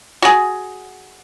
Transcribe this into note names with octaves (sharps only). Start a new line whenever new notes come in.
F#4 G#4